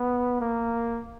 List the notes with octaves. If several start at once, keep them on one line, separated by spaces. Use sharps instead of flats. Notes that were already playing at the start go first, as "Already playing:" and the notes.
Already playing: B3
A#3